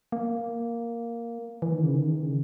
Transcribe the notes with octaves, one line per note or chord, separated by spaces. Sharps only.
A#3
E3
D#3
C#3
D#3
C#3